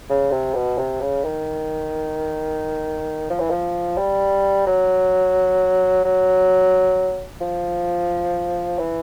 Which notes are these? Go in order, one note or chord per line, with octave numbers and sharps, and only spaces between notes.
C#3
C3
B2
C3
C#3
D#3
F3
E3
F3
G3
F#3
F#3
F3
E3